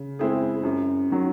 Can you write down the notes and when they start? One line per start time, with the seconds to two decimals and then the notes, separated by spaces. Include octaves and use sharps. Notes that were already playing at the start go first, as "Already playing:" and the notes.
Already playing: C#3
0.19 G#3 C4 E4 G#4
0.63 F#2
1.10 D#3 F#3